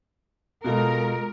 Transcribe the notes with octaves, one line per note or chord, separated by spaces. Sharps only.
B2 G#3 F4 A4 A#4